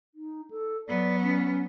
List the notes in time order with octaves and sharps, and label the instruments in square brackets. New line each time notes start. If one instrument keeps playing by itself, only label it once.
[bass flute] D#4
A4
[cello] F#3 B3 [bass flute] D5
[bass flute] C#4